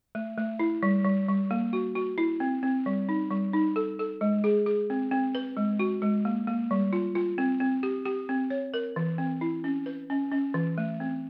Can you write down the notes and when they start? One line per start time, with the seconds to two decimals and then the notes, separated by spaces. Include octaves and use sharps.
0.15 A3
0.38 A3
0.59 E4
0.83 G3
1.05 G3
1.28 G3
1.51 A#3
1.73 F#4
1.95 F#4
2.18 E4
2.40 C4
2.63 C4
2.86 G3
3.09 D#4
3.31 G3
3.53 D#4
3.76 A4
3.99 A4
4.21 G#3
4.44 G#4
4.66 G#4
4.90 C4
5.11 C4
5.35 B4
5.57 G#3
5.79 F#4
6.02 G#3
6.25 A#3
6.47 A#3
6.71 G3
6.93 F4
7.15 F4
7.38 C4
7.60 C4
7.83 G4
8.05 G4
8.29 C4
8.50 C#5
8.74 A#4
8.96 E3
9.18 C4
9.41 E4
9.64 C#4
9.86 B4
10.10 C#4
10.32 C#4
10.54 E3
10.78 A3
11.00 C4